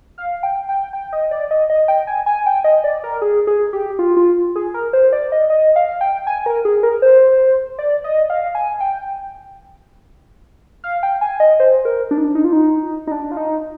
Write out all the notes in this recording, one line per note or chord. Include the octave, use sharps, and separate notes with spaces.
F5
G5
G5
G5
D#5
D5
D#5
D#5
G5
G#5
G#5
G5
D#5
D5
A#4
G#4
G#4
G4
F4
F4
G#4
A#4
C5
D5
D#5
D#5
F5
G5
G#5
A#4
G#4
A#4
C5
D5
D#5
F5
G#5
G5
F5
G5
G#5
D#5
C5
A#4
D4
D#4
D4
D#4
F4
D#4
D#4
D4
F4
D#4